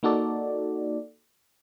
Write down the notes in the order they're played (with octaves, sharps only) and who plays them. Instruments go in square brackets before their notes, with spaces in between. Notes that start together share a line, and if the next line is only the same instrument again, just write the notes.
[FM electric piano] A#3 D#4 F#4 A4 D5